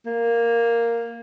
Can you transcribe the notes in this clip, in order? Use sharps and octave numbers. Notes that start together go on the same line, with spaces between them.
A#3